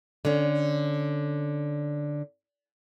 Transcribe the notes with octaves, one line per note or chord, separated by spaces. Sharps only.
D3 C#4